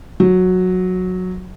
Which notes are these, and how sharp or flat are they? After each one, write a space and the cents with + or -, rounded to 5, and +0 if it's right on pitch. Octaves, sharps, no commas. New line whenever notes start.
F#3 -10